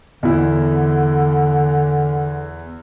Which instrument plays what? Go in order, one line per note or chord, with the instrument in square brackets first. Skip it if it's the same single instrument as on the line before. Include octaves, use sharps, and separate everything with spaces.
[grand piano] E2 E4 [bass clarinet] D3